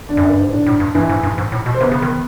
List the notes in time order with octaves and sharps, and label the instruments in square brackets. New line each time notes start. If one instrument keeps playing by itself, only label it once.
[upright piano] D3 D4
[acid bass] F#2
G2
G#2
[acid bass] A2 [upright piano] D3 D4
[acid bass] A2
G2
[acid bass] G2 [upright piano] E3 E4
[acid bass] G#2
G2
G#2
A2
B2
[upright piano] C5
[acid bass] C3 [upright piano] B3 B4
[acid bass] C#3
D#3